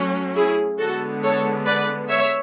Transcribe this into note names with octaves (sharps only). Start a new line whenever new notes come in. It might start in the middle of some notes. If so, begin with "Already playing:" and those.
Already playing: F#3 A3 C#4
E4 G#4
D3 G#3 B3 F#4 A4
A4 C#5
B4 D5
C#5 E5